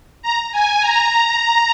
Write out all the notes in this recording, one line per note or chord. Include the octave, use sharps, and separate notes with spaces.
A#5
G#5
A#5